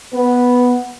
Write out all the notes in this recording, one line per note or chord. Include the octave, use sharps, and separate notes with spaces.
B3